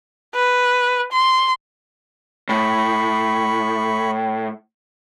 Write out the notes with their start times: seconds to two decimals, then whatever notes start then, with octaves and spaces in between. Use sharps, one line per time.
0.35 B4
1.12 C6
2.49 A2 B5 C#6